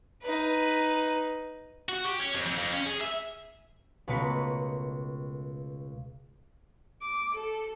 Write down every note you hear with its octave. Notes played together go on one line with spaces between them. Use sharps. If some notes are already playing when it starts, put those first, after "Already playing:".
D#4 B4
F#4
G4
C#4
F2
F2
F2
C#4
G#4
E5
C#2 B2 A3 A#4 B4 C#7
D6
A4